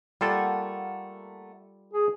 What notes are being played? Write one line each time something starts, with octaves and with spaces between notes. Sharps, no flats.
G3 A3 A#3 F4 A4 F#5
G#4